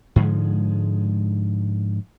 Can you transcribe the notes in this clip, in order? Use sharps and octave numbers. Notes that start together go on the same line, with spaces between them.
G#2 D3 F3 G#3